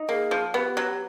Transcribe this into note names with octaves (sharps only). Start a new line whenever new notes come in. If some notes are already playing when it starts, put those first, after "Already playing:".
Already playing: D#4
A#3 G#4
F3
B3 G4
F#3